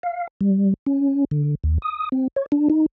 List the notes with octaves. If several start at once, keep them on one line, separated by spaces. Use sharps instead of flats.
F5
G3
C#4
D3
D#2
D#6
C4
C#5
D4
D#4